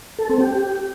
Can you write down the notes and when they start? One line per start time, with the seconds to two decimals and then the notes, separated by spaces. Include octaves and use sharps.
0.19 A4
0.29 C4
0.40 G4